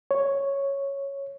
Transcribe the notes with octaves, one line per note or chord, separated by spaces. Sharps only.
C#5